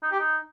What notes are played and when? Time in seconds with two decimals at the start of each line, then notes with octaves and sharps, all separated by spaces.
0.03 D#4
0.11 G4
0.20 D#4